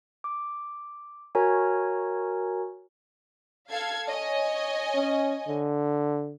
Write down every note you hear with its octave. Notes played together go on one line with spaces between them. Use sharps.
D6
F#4 A#4 C#5 G#5 A#5
A4 F5 G#6
C#5 D#5 G#5
C#4
D3